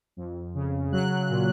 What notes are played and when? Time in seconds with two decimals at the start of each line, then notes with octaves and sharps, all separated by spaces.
0.17 F2
0.54 C#3
0.92 F#3 F#6
1.30 A#2